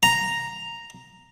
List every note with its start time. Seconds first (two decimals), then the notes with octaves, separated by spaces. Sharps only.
0.03 A#5